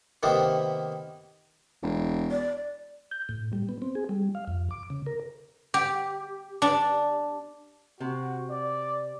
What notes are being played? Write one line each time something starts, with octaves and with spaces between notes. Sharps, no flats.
C3 D#3 A#3 B3
E1
D5
G6
A2
G3
B3
C4
G#4
G3
F5
F2
D6
C#3
A#4
G4
D4
C3 F#4
D5